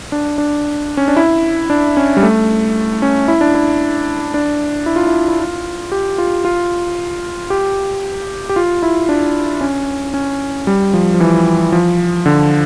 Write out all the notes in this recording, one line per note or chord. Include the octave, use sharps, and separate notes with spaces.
D4
D4
C#4
D4
E4
D4
C#4
G3
A3
C#4
E4
D4
E4
D4
E4
F4
E4
E4
F4
G4
F4
F4
G4
G4
F4
E4
D4
C#4
C#4
G3
F3
F3
E3
F3
D3